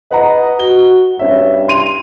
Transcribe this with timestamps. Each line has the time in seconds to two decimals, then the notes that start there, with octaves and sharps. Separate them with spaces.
0.11 B4 D#5 F#5 A#5
0.59 F#4 G7
1.19 G2 C#4 E5
1.68 C6 D#7 F7